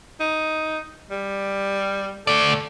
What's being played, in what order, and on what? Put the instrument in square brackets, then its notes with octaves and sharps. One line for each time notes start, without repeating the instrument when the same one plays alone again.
[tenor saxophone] D#4
G3
[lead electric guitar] A3 D5 [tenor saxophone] A4